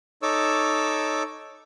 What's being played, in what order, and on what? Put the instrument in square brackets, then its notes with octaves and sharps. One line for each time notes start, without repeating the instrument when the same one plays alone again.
[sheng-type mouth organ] D#4 A4 C#5 D6 E6